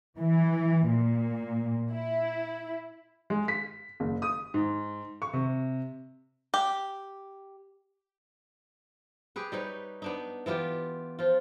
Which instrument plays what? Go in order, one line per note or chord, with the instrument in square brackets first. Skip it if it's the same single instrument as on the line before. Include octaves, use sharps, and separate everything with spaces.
[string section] E3
A#2
E4
[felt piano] G#3
B6
F#1
D#6
G#2
C#6
C3
[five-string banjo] G4
[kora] G4 G#4 B4
G3 D#4 B4 C#5
B3 D4 D#4
E3 B3 F4 G4
F3 F4